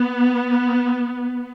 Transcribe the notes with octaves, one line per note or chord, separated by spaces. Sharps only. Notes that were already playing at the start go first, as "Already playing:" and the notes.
Already playing: B3